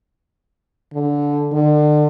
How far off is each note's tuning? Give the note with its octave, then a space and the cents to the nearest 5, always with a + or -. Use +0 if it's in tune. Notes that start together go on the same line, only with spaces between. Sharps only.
D3 -15
D3 +35